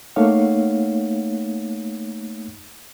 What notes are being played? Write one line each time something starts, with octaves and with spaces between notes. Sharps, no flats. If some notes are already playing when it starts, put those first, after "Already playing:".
A3 A#3 D#4 C#5 F5 F#5